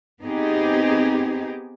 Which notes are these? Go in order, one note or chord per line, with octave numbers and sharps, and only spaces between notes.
B3 C4 D#4 G4 G#4